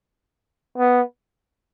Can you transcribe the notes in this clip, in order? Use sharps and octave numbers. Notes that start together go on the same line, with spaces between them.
B3